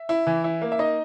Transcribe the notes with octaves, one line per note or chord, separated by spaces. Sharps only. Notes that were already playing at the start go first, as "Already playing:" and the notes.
Already playing: E5
E4
E3
E4
A#3
E5
D#4 D#5